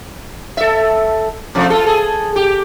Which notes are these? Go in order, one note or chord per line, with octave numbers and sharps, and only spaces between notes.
A4 E5
C3 F3 A3
F4 A4
G#4 A4
G4